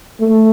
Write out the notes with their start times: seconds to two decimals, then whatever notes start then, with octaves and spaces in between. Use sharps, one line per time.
0.21 A3